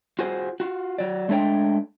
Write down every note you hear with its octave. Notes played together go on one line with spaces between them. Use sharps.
F4 F#4 G#4 C5
F4 F#4
F#3 D5
G#3 A3 D4 C#5 G5